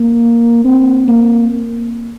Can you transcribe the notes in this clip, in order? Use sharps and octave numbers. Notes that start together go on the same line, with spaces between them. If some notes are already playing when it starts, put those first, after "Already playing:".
Already playing: A#3
C4
A#3